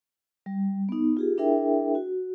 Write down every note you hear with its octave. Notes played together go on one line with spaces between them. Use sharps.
G3
B3 D#4
F4 G4 G#4
D4 E4 G#4 A#4 E5 G5
F#4